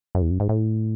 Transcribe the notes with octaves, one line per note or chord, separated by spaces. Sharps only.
F#2
E2
F#2
G#2
A2